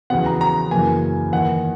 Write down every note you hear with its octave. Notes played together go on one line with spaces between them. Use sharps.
E2 C#3 F#3 B3 F#5
A#5
A#5
F#2 C#3 E3 A#3 G#5
E2 D#3 A#3 F#5